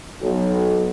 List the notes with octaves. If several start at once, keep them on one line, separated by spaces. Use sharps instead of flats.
B1